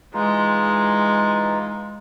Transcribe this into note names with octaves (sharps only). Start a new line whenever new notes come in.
E3 G#3 D#4 F4